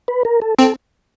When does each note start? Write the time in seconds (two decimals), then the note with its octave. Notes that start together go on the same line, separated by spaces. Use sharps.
0.08 B4
0.25 A#4
0.42 A4
0.58 C4 A4